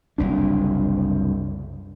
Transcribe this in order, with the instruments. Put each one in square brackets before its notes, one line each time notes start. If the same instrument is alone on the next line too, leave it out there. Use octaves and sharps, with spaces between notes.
[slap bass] F#1 C2 D4